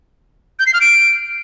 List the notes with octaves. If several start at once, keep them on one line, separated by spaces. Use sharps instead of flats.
G6
C7
F6
D7